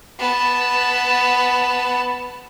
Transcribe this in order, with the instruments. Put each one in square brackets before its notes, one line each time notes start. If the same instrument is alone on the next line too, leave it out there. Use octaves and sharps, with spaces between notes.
[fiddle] B3 A5